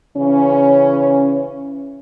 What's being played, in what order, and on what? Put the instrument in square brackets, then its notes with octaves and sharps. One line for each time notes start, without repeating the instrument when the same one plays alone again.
[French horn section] C#3 E3 C#4